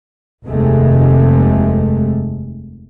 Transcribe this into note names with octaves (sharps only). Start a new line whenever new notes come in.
F1 D#2 C3 G#3 A3